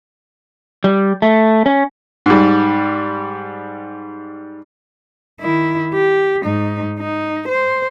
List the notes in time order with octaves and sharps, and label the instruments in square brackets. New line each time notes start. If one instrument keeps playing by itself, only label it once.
[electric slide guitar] G3
A3
C#4
[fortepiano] G#2 G3
[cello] D#3 E4
G4
G#2 D#4
D#4
C5